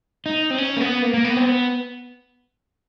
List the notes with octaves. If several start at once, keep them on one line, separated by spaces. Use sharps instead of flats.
D#4
C4
C#4
A#3
B3
A#3
A#3
B3
C4
B3